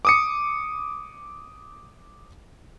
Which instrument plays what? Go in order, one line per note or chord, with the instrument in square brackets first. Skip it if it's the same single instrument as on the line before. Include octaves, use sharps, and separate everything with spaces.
[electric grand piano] D6 D#6 C#7